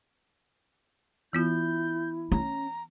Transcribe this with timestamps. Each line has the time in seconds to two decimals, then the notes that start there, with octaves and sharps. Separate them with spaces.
1.33 E3 B3 E4 F4 G6
2.32 C#4 A#5